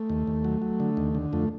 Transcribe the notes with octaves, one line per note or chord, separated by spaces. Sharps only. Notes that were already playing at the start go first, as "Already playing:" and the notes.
Already playing: A3
D#2
D#2
F#3
F#3
D3
D#2
D3
F2 A3